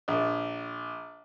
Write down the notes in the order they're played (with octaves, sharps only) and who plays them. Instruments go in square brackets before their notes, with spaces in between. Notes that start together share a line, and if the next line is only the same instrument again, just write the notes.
[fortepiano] A#1